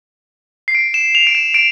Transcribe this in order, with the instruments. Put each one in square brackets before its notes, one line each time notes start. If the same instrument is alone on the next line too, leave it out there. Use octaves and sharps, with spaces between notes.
[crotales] C7
D7
E7
F7
D7
E7
D7